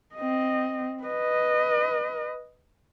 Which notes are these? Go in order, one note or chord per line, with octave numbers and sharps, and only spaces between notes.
C4 D#5
B4 D#5